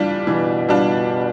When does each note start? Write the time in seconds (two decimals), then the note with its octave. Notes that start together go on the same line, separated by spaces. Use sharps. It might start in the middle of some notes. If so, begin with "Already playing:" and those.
Already playing: E3 G3 D4 F4
0.27 B2 E3
0.69 G3 D4 F4